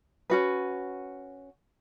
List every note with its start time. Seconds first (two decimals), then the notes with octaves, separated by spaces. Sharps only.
0.30 C#4 F#4 B4